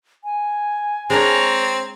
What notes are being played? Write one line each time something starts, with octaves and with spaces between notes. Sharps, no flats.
G#5
G#3 C4 D4 A#4 C#5 A#5